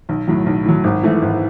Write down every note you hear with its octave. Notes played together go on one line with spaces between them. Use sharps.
B1
A2 F#3
B1
A2 F#3
G#1
G#2 E3 A3
G#1